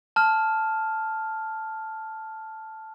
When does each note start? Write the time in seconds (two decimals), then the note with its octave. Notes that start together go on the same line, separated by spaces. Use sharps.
0.16 A5 F6